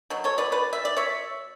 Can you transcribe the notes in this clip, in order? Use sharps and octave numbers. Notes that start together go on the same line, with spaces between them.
B2 F#3
A4 C#5
B4 D5
B4 D5
E5
D5
C#5 E5